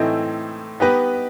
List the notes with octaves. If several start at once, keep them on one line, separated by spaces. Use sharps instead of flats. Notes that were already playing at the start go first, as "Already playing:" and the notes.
Already playing: A2 E3 A3 C4 D#4
B3 D#4 G4 B4 D#5